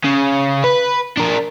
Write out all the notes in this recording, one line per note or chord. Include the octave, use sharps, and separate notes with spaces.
C#3
B4
D4 A#4